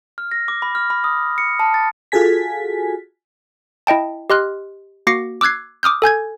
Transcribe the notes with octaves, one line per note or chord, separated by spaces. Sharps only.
F6
A#6
D6
B5
F6
B5
D#6
C#7
A5
A6
F4 F#4 G#4 A4 G#5 B6
E4 D#5 G5 A5
G4 D#5 C6 F6 F#6
A#3 F#4 D6 A#6 C7 C#7
D6 E6 F#6 G#6 C7
D6 D#6 F6 G6
A4 G#5 G6 G#6